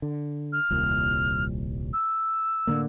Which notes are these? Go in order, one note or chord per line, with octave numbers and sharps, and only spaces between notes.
D3
F6
D#1 C2 A#2
E6
A2 D3 A#3